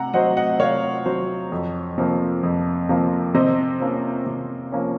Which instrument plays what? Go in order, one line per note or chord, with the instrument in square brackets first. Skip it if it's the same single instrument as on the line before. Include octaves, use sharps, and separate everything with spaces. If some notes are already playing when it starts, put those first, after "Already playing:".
Already playing: [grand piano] C3 [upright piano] F#5 A#5
[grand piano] F#3 C4 F#4 C5 [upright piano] D#5 F#5
[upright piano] D#5 F#5
[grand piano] C3 [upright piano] C#5 F5
[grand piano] F#3 C4 F#4 C5
F2
C3 F3 A#3
F2
C3 F3 A#3
[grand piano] C3 [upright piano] C5 D#5
[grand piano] F3 A#3 C#4
C3
F3 A#3 C#4